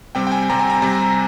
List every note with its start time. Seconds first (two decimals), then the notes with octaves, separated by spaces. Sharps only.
0.15 C3 G3 C4 G5
0.27 G5
0.32 G#5
0.49 C3 G3 C4 A#5
0.59 G#5
0.70 A#5
0.82 C3 G3 C4